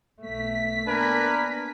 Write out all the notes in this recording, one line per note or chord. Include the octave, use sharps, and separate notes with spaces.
B1 A3 B6
A#3 B3 D4 A#4 B4 G#5